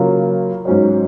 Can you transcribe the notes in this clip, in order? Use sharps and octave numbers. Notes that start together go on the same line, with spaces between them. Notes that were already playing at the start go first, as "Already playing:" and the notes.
Already playing: C#3 F#3 A#3 F4
G#2 F#3 C#4 F#4 C5